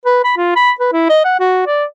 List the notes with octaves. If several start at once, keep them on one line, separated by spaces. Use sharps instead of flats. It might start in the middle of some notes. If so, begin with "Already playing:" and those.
B4
B5
F4
B5
B4
E4
D#5
F#5
F#4
D5